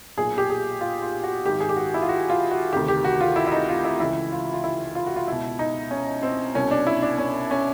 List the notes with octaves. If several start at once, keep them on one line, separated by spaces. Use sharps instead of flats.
B1 A#2 G#4
G4
G#4
F4
F4
F#4
G#1 G#2 D#3 G4
G#4
G4
F#4
E4
F4
F#4
F4
F#4
D2 C3 D#3 G4
G4
F#4
F4
E4
E4
D#4
F4
E4
C#2 C#3 E3 E4
F4
F4
E4
F4
F#4
F4
C#2 B2 E4
D#4
C#4
C4
C2 B2 C#4
D4
E4
D4
C#4
C#4